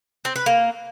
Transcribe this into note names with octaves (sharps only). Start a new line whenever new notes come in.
C4
B4
A#3